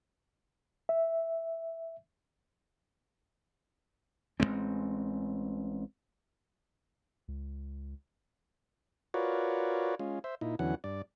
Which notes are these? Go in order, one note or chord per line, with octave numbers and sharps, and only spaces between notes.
E5
A1 F3 G#3 C4
C#2
F4 F#4 A#4 B4 C#5 D5
G#3 C#4 F4
C5 E5
A#2 D#4 E4
E2 D3 E3 F#3 C#4 F#5
G2 D5